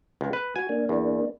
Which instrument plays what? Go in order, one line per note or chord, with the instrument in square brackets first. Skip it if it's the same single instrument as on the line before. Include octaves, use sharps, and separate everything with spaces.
[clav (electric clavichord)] C#2
B4
[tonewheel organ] F#4 [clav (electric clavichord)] G#5
[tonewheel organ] A#3 D4
[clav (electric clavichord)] E2